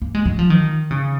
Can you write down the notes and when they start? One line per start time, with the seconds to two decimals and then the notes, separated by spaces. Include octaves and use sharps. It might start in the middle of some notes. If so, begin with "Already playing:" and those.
0.02 A#3
0.15 G#3
0.25 F#3
0.39 F3
0.50 D#3
0.91 C#3